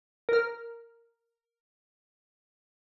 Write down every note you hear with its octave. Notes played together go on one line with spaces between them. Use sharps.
A#4 F6